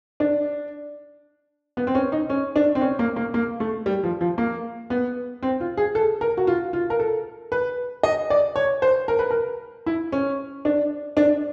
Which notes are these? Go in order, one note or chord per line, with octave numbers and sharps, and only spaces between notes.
D4
B3
C4
C#4
D#4
C#4
D4
C4
C#4
A#3
A#3
A#3
A3
G3
F3
F3
A#3
B3
C4
F4
G#4
A4
A#4
F#4
F4
F4
A#4
A4
B4
D#5
D5
C#5
C5
A#4
B4
A#4
E4
C#4
D4
D4